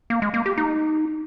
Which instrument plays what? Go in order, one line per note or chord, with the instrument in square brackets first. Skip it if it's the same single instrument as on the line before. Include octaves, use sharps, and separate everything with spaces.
[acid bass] A#3
G#3
A#3
G4
D#4